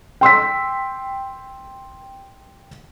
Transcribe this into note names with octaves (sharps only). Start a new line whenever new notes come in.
G5 C6 E6 B6